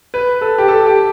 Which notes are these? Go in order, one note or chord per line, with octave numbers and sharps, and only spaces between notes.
B4
A4
G4
A4
G4